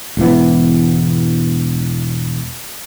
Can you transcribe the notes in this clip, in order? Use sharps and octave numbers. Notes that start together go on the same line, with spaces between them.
E1 G#2 E3 B3